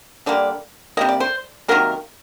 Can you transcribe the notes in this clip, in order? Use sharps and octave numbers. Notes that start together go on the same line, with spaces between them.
D3 G3 A#3 D5
C3 G3 A#3 D#5
D5
C5
C3 D#3 F#3 A#3 A#4